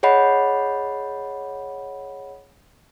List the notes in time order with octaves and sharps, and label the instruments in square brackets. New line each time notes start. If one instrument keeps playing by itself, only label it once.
[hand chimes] G#4 C#5 D#5 F#5 B5